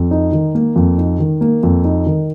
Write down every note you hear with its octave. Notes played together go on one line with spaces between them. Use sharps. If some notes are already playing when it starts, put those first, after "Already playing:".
Already playing: F2
D#4
D#3
A#3
F2
D#4
D#3
A#3
F2
D#4
D#3